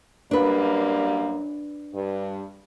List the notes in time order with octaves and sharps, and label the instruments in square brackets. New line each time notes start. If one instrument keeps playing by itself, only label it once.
[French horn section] F#2 G3 A#3 [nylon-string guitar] D4 B4
[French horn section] G2